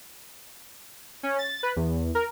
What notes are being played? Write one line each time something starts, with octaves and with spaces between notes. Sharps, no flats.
C#4
A6
B4
E2
A#4